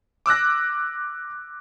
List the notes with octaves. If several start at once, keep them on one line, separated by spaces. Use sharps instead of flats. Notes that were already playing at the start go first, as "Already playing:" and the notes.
D6 E6 F#6 A#6